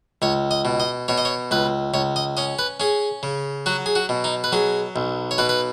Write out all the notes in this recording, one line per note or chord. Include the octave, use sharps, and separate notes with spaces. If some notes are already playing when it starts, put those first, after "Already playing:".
C#2 C#5
D#5
B2
D#5
B2 C#5
D#5
C#5
C#2 B4
C#2 C#5
D#5
C#4 D#5
B4
C#4 G#4
C#3
F#3 F#4
G#4
F#4
B2
D#4
B4
F#3 G#4
B1
C#5
B2 B4
B4